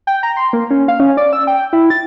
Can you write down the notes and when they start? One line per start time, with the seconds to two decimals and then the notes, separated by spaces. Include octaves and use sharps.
0.07 G5
0.23 A#5
0.37 C6
0.53 A#3
0.70 C#4
0.88 F5
1.00 C#4
1.17 D5
1.33 E6
1.47 G5
1.73 E4
1.90 A6